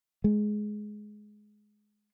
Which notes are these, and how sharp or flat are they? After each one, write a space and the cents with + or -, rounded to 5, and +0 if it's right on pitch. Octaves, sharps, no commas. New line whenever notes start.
G#3 +15